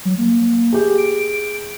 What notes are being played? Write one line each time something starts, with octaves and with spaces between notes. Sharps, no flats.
F#3
A#3
G4 G#4
D7